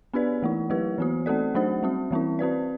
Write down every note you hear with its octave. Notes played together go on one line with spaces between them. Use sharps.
B3 D4 G4 B4 D5
E3 A3 E4
F#3 A3 E4 G4 B4
E3 B3 F#4
A3 C4 F#4 A4 D5
F#3 A3 D4 F#4 C5
G3 C4 F#4
E3 G3 C4 E4
C4 F#4 B4 D5